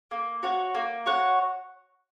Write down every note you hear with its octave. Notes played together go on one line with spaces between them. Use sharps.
A#3
F#4 C#5 F#5
A#3
F#4 C#5 F#5